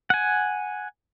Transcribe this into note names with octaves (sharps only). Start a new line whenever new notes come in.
F#5 G#5